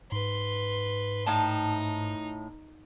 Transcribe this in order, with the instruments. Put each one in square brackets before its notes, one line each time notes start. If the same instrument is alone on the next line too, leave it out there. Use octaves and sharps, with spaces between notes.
[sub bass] G#2 [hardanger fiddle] B4 C6
[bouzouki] A2 A5 [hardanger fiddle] D#4